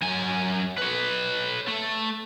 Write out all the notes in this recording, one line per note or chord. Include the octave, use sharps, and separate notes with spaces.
F#2 G#5
B4 C#5
A3